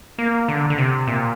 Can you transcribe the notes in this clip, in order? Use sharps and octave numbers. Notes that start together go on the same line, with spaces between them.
A#3
D3
D3
C3
A#2